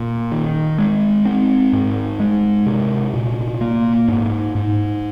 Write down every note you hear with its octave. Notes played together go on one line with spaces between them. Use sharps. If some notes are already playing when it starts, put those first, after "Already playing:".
Already playing: A#2
D#3
G#3
C4
G#2
G#3
C3
A#2
A#3
G#2
G#2